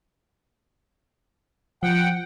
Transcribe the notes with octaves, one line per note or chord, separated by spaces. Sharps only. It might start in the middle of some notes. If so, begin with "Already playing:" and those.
F3 F#5 G5